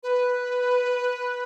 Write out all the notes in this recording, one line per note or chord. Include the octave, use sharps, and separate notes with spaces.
B4